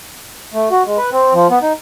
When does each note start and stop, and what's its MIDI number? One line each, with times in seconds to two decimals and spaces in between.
0.54 0.69 57
0.71 0.83 66
0.86 0.97 56
0.97 1.10 71
1.12 1.33 60
1.34 1.47 53
1.50 1.59 59
1.62 1.73 63